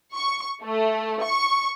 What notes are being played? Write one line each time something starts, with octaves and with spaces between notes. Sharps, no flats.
C#6
A3
C#6